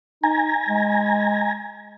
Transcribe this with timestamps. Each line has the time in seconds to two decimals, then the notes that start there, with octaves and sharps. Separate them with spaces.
0.23 D#4 G#5 A#5
0.69 G#3